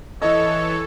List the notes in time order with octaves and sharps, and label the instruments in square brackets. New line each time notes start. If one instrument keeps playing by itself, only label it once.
[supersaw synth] E3 A4 [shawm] C#5 [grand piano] D#5